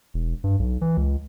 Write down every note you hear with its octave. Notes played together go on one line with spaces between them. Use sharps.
E1
G2
B1
E3
C#2